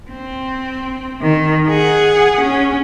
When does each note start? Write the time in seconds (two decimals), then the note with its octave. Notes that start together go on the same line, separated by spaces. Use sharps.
0.11 C4
1.21 D#3
1.69 G#4 F#5
2.41 C#4